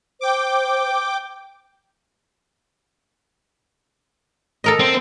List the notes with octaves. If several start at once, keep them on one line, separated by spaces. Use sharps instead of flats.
C5 G5 D6
A4 A#4 D#5
C4